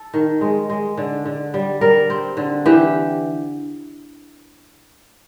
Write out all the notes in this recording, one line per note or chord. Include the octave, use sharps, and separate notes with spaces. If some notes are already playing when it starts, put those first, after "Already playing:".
Already playing: A4
D#3
G#3
G#3
D3
D3
G3
G3 A#4
C4
D3
E3 G4